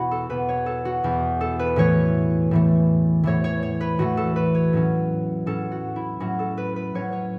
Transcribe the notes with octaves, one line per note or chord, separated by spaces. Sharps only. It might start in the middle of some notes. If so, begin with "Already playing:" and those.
Already playing: E2 B2 B3 E4 F#4
A4
E2 B2 B3 B4
C#5
A4
F#4
E2 B2 B3
A4
B4
A2 E3 A3 C#5
A2 E3 A3
A2 E3 A3 C#5
C#5
C#5
B4
A2 E3 A3 F#4
A4
B4
C#5
A2 F#3 C#4
A2 F#3 C#4 A4
F#4
E4
A2 F#3 C#4 F#4
A4
B4
B4
A2 F#3 C#4 C#5
C#5